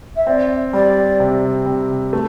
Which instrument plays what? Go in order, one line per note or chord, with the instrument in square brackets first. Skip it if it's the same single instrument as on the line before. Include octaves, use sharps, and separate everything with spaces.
[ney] E5
[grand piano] C4 [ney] D5
[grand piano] G3 [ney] D5
[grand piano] C3
C3
A3